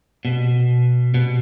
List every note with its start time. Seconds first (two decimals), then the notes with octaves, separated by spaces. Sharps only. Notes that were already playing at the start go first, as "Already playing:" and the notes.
0.25 B2
1.14 B2